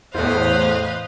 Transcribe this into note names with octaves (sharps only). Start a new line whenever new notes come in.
E2 A2 B4 C5 D#5 F5